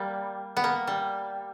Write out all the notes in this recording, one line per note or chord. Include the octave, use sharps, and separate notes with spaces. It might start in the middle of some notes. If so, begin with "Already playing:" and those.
Already playing: G3 A#3
B3
A#3
G3